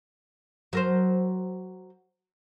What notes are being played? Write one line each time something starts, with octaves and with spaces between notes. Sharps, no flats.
F#3 A#4 C5